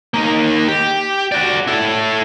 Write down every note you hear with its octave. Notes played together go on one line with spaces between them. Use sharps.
A#3 D#4
G4
F#4 D5
E4 A4